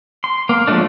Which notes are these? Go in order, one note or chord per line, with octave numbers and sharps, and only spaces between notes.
C6
A#3
F3 F#3 G#3 A3 D4